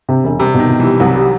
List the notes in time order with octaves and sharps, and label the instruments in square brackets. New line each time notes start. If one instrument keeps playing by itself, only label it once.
[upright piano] C3
E1
[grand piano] C3 [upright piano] G3
[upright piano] B2 [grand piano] D#3
[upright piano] B2
[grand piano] E3
[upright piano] G3
[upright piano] C2 [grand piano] F#3
[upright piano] G3